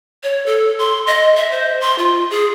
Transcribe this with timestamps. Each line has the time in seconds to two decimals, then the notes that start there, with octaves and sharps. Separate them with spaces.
0.23 C#5
0.46 A4
0.79 C6
1.07 D#5
1.37 E5
1.52 C5
1.81 C6
1.98 F4
2.30 G#4